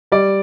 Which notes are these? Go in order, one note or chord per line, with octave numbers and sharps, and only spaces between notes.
G3 D5